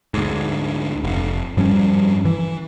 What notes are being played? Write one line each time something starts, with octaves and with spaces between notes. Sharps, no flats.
D2 G#2
F1
G2 F3 G3 C#4
E3